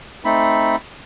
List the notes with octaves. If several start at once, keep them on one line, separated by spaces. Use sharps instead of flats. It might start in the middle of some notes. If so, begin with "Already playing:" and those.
A3 C4 D#4 B5